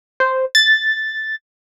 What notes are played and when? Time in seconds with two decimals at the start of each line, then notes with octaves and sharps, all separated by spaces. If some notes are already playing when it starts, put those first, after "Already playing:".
0.20 C5
0.55 A6